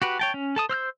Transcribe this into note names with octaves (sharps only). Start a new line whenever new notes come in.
F#4 G4 B4
C#5 G5 A5
C#4
A4 A5 D#6
C5 E6 F6 G6